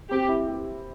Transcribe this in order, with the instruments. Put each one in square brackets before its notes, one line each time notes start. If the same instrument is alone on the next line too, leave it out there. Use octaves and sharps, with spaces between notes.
[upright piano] C4 [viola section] G4
[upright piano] E4
G4